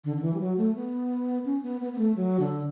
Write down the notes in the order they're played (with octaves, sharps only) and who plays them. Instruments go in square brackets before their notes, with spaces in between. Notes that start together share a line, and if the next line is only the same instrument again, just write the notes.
[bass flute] D3
D3
E3
G3
F#3
A3
B3
C#4
B3
B3
B3
A3
F#3
D3